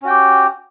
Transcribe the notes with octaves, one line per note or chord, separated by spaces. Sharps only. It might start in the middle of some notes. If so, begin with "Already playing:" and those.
C#4 F#4 G4 G5